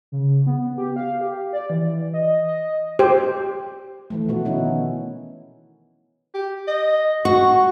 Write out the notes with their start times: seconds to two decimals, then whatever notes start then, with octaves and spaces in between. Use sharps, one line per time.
0.12 C#3
0.47 B3
0.78 G4
0.96 F5
1.21 G4
1.53 D5
1.70 E3
2.14 D#5
2.47 D#5
2.99 G4 C5
4.10 E3 F3 A3
4.28 B2 B3 F#4
4.45 D#3 B3 C#4 D#4 E4
6.34 G4
6.68 D#5
7.25 F#4 C#6